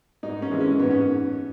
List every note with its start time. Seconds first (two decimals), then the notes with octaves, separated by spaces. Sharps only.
0.23 G#2 D#4
0.42 C#4
0.51 E3 G#3
0.60 C#4
0.79 G#2 B3
0.91 C#4